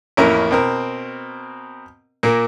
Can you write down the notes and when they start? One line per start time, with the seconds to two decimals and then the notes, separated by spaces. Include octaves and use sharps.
0.17 A1 F2 A#3 C#4 E4 A#5
0.51 B2 C4 A#4
2.23 A#2 A#3